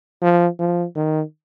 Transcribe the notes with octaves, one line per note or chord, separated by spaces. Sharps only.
F3
F3
D#3